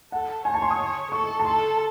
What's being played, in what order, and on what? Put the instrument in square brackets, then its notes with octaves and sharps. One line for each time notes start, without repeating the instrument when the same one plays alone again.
[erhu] A4 [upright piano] F#5
[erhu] C#5 [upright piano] G#5
[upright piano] A5
C6
D#6
[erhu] A4 [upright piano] C#6
[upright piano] A5
[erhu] A4 [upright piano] C6